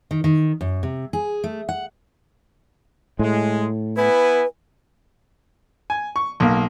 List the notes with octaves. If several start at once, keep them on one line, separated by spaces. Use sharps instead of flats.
D#3
D#3
F#2
C3
G#4
A3
F#5
A2 G#3
B3 E4 B4 G#5
G#5
C#6
B1 A#3